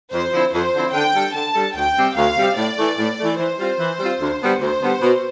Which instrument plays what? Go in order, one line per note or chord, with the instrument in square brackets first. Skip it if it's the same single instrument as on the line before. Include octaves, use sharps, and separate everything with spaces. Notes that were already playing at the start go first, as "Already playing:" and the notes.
[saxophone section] F2 [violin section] C5
[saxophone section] D3 F3 C4 E4
[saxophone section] F2 [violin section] C5
[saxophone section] D3 F3 C4 E4
[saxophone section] D3 [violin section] G5
[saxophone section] G3 D4 A4
[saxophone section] D3 [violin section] A5
[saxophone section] G3 D4 A4
[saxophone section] D2 [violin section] G5
[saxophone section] C3 G3 C4 G4
[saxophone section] D2 [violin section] F5
[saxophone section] C3 G3 C4 G4
[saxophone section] A2 [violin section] D5
[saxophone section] E3 A3
A2
E3 A3
[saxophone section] E3 [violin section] C5
[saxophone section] G3 C4 F4
E3
G3 C4 F4
D2
D3 G3 B3
[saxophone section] D2 [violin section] C5
[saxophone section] D3 G3 B3
B2